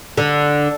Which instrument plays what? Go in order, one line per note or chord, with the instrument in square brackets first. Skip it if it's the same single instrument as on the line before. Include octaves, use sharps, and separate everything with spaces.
[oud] D3